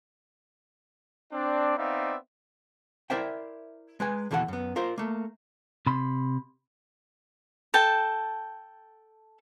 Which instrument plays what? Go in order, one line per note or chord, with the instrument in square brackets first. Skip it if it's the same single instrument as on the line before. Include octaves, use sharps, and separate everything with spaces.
[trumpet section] C4 D4 D5
B3 C4 D#4 D5 E5 F5
[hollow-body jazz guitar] E4 A#4 C5 D5 E5 G5
G#3 B4 G#5
D#2 B2 E3 A4 A#4 F#5
F#2 B3
F4 A#4 C5
A3 A#3
[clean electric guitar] C3 B5 C6
[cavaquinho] A4 G5 A5